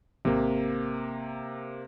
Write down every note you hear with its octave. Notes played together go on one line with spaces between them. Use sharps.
G#1 C3 A#3